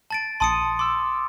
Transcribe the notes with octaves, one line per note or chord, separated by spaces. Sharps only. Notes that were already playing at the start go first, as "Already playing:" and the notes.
A5 A6 D7
A#1 A5 C6 D#6 C#7 D#7
C6 D6 E6